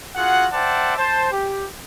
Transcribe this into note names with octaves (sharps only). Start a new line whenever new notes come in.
F4 F#4 G#4 F#5
C5 D5 E5 F#5 G5 A5
C5 A5
G4